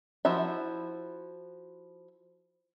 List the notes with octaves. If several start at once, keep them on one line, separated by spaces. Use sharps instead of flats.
F3 E4 F#4 E5